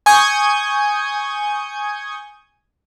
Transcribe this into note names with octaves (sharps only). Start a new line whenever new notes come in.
G#5 C#6 D#6 G6 G#6